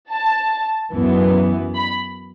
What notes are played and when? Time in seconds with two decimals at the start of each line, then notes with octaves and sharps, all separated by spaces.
0.10 A5
0.93 F#2 E3 B3
1.75 B5